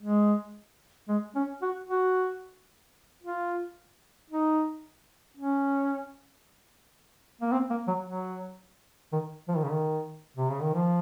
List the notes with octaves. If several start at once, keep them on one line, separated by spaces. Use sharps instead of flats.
G#3
G#3
C#4
F#4
F#4
F4
D#4
C#4
A#3
C4
A#3
F#3
F#3
D#3
F3
D#3
C#3
D#3
C3
C#3
D#3
F3